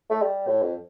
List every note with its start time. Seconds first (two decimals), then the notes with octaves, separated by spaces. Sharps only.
0.10 A3
0.22 G3
0.47 A2
0.62 F2